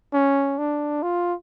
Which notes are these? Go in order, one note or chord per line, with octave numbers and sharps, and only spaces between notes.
C#4
D4
F4